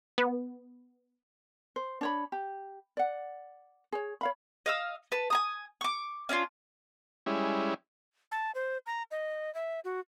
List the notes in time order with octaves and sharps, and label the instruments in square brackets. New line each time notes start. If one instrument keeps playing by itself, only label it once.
[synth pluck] B3
[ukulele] C5
D4 C#5 B5
G4
D5 F#5
G#4 C#5
C#5 F5 B5
[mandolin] D#5 F5 E6
B4 A5
G#5 A#5 D#6
C#6 D6
C#4 D4 E4 F4
[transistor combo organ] G3 G#3 C#4 E4
[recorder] A5
C5
A#5
D#5
E5
F#4